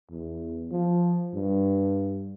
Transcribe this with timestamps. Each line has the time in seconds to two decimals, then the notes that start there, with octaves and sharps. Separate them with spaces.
0.11 E2
0.71 F3
1.34 G2